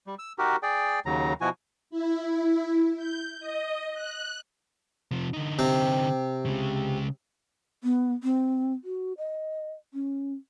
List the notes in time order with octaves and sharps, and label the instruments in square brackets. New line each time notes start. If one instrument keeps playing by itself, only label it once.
[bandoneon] G3
E6
D#4 F#4 G4 A#4
G#4 D5 G5
D#2 C#3 F#3 A#5
B2 F3 E4 F#4 G#5
[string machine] E4
G6
D#5
F#6
[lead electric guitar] C3 F3
D3 D#4
[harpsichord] C3
[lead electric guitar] C#3 G#3
[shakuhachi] B3
C4
F#4
D#5
C#4